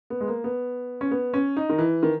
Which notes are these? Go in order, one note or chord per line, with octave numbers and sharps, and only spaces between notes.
B3
G#3
A#3
B3
C#4
B3
C#4
D#4
D#3
E3
D#3